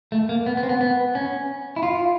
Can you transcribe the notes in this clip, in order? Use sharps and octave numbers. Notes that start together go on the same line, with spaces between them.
A3
A#3
B3
B3
C4
B3
B3
C#4
E4
F4